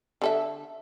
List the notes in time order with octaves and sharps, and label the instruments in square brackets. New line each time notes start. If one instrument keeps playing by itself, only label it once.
[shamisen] D3 A4 E5